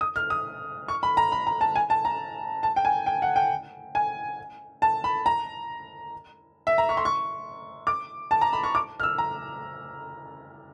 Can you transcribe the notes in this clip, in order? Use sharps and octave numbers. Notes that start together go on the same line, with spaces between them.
D#6
F6
D#6
C#6
B5
A#5
B5
A#5
A5
G#5
A5
A#5
A5
G5
G#5
G5
F#5
G5
G#5
A5
B5
A#5
E5
A#5
C#6
C6
C#6
D6
A5
A#5
B5
C#6
D6
F6
E6
A#5